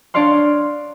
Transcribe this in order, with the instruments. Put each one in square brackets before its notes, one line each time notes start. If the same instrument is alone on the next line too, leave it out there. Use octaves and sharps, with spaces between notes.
[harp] D4 C#5 D5 F5 C6